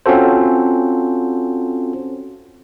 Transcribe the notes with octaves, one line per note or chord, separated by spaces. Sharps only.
C4 C#4 F4 F#4 A4 C5